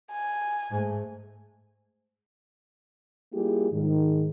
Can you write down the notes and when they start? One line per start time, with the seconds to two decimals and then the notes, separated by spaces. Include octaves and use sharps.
0.11 G#5
0.70 G#2 A3
3.33 G3 A#3 E4 F4 G4 G#4
3.73 G#2 D#3